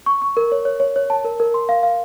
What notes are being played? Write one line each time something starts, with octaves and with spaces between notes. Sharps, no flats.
C#6
C#6
A#4
C#5
C#5
C#5
C#5
A5
A#4
A#4
C6
F5
F5